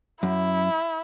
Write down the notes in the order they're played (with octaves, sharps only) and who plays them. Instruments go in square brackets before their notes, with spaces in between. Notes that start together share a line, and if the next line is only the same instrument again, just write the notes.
[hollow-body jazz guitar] F#2 [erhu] E4